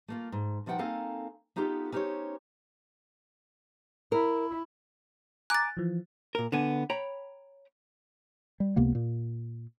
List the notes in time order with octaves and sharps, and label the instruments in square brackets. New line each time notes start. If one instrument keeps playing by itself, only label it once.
[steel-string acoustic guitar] A3 A#3 F4
G#2
B2 F3 D#4 F#5 G5 A5
A#3 C4 D#4 A4 F5 G#5
B3 D#4 F4 G4 A4
C#4 D#4 G4 A#4 C5 C#5
[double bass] E4 [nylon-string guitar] A#4
[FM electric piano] G#5 A#5 D6 [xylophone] F#6 A6
[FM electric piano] E3 F3
[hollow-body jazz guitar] A#2 A#4
D3 B3 G#5
C#5 G5 A#5 B5
[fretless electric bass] G3
C#2 C3 A#3 B3
A#2